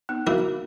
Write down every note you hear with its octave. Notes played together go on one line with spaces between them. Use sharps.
B3 D#4
A#3 E4 F#4 A#4